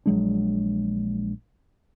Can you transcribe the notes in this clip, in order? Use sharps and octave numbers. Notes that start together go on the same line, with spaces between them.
A#1 F#3 G#3 D4